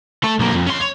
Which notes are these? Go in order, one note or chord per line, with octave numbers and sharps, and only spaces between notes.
A3 A4
B1 A#3
F2
C#4 C6
C#5